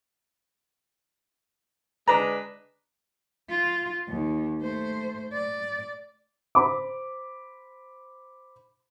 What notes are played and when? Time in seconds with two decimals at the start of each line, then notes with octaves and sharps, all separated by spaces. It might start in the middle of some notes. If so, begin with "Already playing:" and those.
2.08 G#3 D4 B4 A#5
3.49 F4
4.09 D#2
4.62 A3 C5
5.33 D5
6.55 C5 B5 D6